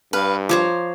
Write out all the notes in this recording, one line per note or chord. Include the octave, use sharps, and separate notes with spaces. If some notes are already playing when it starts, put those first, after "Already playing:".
G2 B4 F5
F3 C5 C#5 A#5 D6